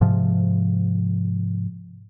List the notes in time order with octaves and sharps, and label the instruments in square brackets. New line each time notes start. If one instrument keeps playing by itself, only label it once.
[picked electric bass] G#2 C3 F3